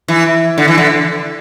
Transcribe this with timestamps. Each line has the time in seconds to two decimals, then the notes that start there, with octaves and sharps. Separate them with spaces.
0.08 E3
0.58 D3
0.68 E3
0.78 D3